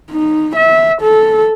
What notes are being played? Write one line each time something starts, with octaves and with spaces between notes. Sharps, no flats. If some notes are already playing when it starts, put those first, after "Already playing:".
D#4
E5
A4